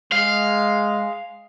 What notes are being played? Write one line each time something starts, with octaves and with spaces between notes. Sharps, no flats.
G#3 F5